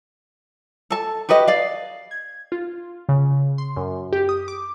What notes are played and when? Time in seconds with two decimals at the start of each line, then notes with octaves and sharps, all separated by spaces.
0.90 A4 A5
1.29 F#4 G4 B4 D#5
1.48 D5 F5
2.11 G#6
2.52 F4
3.09 C#3
3.58 C6
3.76 F#2
4.13 G4
4.29 D#6
4.48 D6